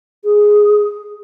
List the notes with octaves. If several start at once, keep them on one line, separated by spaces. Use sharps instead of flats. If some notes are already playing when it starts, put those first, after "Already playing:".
G#4